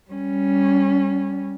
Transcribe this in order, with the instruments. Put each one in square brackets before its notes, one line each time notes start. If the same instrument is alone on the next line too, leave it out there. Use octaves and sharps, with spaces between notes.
[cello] G3 C#4